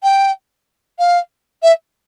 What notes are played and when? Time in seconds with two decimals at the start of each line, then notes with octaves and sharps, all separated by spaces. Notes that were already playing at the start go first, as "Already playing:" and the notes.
0.03 G5
0.99 F5
1.63 E5